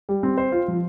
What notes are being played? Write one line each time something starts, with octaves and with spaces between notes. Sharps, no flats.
G3
C4
C5
F4
F3